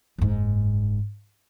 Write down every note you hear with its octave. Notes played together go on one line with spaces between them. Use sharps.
F#1 G#2